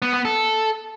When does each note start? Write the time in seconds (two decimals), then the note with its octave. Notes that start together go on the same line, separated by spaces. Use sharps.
0.02 B3
0.14 B3
0.25 A4